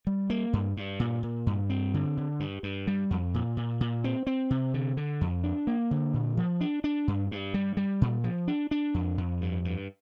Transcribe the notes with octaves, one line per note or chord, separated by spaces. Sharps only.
G3
A#3
G2
G2
A#2
A#2
G2
C4
D3
D3
G2
G2
G3
F2
A#2
A#2
A#2
C4
C4
C3
D3
D3
F2
D4
A#3
D3
A#2
F3
D4
D4
G2
G2
G3
G3
A#2
F3
D4
D4
F2
F2
G2
G2